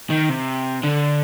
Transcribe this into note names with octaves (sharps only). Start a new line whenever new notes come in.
D#3
C3
D3